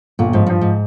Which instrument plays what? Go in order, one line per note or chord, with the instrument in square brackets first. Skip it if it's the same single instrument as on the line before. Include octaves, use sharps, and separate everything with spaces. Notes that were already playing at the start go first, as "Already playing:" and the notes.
[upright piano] G1 [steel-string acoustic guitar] A#2
[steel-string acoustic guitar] G#2 [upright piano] F3
[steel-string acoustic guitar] G2 [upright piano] F3
[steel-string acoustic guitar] G#2